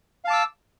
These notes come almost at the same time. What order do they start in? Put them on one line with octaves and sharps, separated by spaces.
F5 A5 D6 E6